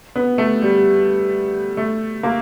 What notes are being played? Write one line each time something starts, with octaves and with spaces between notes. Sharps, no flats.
B3
A3
G3
A3
A#3